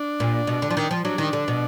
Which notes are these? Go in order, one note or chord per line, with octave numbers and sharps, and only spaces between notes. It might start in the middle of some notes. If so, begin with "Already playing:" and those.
Already playing: D4
A#2
B2
D3
F3
D#3
F3
F#3 D4
D#3
D3
B2